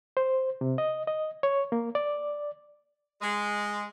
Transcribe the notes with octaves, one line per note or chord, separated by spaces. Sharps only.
C5
C3
D#5
D#5
C#5
A#3
D5
G#3